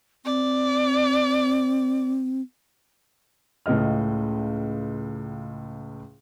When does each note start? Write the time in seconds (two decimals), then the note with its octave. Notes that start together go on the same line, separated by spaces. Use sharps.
0.25 C4 D5
3.66 C#2 A2 C#3 D#5 F6